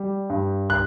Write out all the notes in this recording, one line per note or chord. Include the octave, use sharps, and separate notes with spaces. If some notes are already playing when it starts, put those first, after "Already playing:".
Already playing: G3
G2
F#6